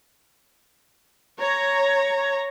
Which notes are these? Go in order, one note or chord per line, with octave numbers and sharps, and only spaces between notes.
C#5 A#5